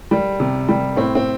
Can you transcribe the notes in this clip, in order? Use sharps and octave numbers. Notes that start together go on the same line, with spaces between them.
G3
C3
G3
A2 C4
C4